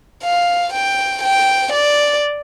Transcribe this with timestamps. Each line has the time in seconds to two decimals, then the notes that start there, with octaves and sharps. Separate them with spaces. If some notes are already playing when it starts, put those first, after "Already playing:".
0.24 F5
0.73 G5
1.23 G5
1.73 D5